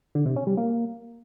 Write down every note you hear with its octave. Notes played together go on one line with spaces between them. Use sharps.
D3
C3
C#4
G3
A#3